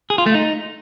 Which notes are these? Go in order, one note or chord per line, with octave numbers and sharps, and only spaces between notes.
G#4
F4
A3
D#4